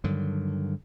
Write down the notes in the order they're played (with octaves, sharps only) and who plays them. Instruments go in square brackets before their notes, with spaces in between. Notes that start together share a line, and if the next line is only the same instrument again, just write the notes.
[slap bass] G2 D3 D#3 F#3